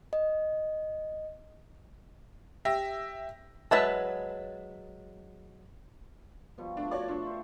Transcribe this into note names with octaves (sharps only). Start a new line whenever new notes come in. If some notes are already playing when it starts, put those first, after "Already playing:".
D#5
G4 E5 A#6
F#3 G#3 B4 E5 A5
B2 F3 G3
A3 D4
F#4 C#5 D5
D4 F4 E5 C#6
G4 C5 E5